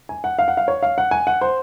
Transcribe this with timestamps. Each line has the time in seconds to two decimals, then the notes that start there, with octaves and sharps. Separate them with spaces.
0.09 G#5
0.24 F#5
0.39 F5
0.48 F#5
0.57 F5
0.68 C#5
0.83 F5
0.98 F#5
1.11 G#5
1.27 F#5
1.41 C5